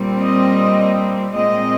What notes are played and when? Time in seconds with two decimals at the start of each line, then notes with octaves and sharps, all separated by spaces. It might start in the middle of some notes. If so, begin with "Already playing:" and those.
Already playing: A#2 G3 C4
0.22 D#5
1.35 A#2 G#3 C4 D#5